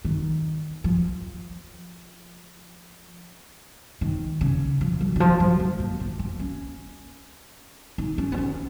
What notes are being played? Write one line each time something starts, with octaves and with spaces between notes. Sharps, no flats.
D#3
F3
D#3
C#3
F3
F#3
D#3
F3
F#3
G#3
A#3
A#3
A#3
C#4
D#4
C#4
B3
C#4